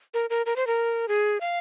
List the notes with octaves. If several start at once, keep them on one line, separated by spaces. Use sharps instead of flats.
A#4
A#4
A#4
C5
A#4
G#4
F5